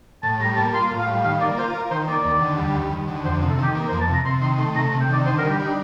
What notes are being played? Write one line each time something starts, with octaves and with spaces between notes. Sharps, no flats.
A2 A5
G3 A#5
A#3 A5
F4 C6
A2
F5
G3
D#3 F5
A#3 D5
F4 C5
A#4
D#3 C5
A#3 D5
D#2
D3
G3
D#2
D#2
D3
F2 C5
C3
A4
D#3 G4
A#3
C5
F2
A5
C3 A#5
C3 C6
D#3 C6
A3 C6
C3 A#5
C3
G5
D#3 D5
D3 C5
A#4
G3
G4
D4 D#4